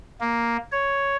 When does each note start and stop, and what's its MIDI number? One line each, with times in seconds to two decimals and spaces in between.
0.20 0.57 58
0.72 1.17 73